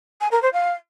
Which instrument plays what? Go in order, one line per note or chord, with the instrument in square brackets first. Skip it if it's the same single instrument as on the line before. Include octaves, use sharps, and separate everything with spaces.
[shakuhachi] G#5
A#4
C5
F5